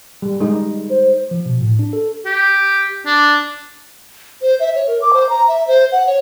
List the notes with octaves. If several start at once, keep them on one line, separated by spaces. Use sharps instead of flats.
G3
G#3 D#4
C5
F3
B2
A2
D4
A4
G4
D4
C5
E5
C#5
A#4
D6
C5
A#5
E5
C5
F#5
C#5